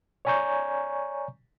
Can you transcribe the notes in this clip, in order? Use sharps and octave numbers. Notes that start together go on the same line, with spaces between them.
C#5 D5 G#5 A#5 C#6 G6